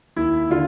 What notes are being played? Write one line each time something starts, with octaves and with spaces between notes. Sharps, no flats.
D#2 E4
D3 F4